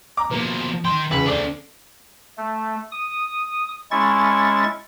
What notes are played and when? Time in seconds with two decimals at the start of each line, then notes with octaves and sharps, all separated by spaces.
0.17 A#5 D6
0.31 B2 F3 A#3
0.85 D#3 G5 C6
1.11 C#2 E3 B4
1.26 D2 D4 C5 D5 D6
2.38 A3
2.92 D#6
3.91 G#3 C#4 E4 C#6 A6